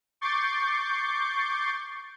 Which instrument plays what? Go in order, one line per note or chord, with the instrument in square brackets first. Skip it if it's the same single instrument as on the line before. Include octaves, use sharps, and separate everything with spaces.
[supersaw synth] C#6 D6 G6 A6 C7